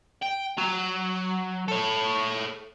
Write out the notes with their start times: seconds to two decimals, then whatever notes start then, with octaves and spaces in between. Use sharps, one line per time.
0.22 G5
0.58 F#3
1.68 A4 C#5